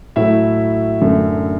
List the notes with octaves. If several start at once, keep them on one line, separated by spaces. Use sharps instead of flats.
A2 F#3 A3 E4 E5
F#2 D3 A3